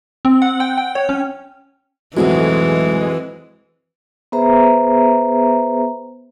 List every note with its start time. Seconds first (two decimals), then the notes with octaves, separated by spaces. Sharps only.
0.25 C4
0.42 F#5
0.60 G5
0.78 G5
0.95 C#5
1.09 C#4
2.17 B1 F2 A2 E3 G#3 C4 E4 F#4
4.32 B3 G#4 B4 C5 E5 A#5